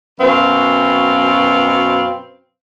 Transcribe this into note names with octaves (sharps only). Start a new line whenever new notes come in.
F#2 B2 C4 B4 F5